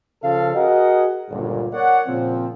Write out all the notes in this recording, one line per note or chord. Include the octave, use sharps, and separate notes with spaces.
C#3 F3 A4 F5
F#4 G#4 A#4 D#5 F#5
G1 C#2 G2 A#2
A#4 C#5 D5 F#5
A#2 C#3 F3 C4